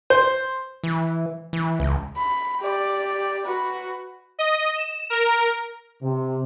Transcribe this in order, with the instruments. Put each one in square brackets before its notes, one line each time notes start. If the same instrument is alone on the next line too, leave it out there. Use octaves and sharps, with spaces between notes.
[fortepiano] C5
[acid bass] E3
E3
C#2
[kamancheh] B5
G4 D5
F#4 B4
[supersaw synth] D#5
E7
A#4
[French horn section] C3